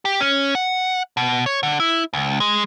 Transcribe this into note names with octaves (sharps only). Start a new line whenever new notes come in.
G4
C#4
F#5
B2
C#5
D3
E4
C#2
G#3